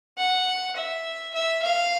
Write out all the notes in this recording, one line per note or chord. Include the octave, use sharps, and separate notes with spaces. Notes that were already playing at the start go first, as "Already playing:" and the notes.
F#5
E5
E5
F5